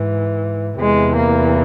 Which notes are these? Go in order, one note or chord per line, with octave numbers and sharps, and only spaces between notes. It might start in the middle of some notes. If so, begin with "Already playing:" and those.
Already playing: G#2 E3
E2 C3 E3 G#3
A#3